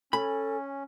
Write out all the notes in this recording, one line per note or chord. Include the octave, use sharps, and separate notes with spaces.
C#4 A4 G#5 B5